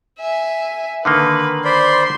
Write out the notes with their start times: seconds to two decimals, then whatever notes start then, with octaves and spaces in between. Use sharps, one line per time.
0.19 E5 G#5
1.05 D3 D#3 A#3 B4
1.65 C5 D5 B5 C6 C7